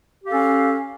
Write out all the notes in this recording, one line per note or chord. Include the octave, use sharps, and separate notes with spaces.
C#4 G4 A4 F5